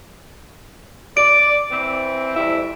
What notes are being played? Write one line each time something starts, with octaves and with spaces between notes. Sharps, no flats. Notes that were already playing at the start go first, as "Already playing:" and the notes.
D5 D7
E3 C4
F2 G3 E4